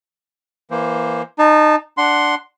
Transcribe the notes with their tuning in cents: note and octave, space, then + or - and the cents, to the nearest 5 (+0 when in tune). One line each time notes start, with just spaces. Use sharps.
E3 +0 A#3 +20 C5 +0
D#4 -25 A5 +0
D4 +0 F#5 +0 C6 +0